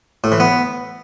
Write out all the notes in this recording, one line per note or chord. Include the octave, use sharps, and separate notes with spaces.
A2
E3
B3